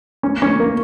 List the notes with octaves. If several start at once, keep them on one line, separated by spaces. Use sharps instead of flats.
C#4
C#4
A#3